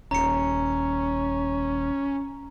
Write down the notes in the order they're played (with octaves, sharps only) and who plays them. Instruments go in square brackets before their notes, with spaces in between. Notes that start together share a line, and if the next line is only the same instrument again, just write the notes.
[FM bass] D#1 [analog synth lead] C#4 [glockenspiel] A#5 C#7